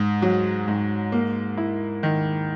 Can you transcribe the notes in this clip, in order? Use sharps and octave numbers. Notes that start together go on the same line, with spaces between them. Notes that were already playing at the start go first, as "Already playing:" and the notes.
Already playing: G#2
F#3
G#2
A#3
E4
D#3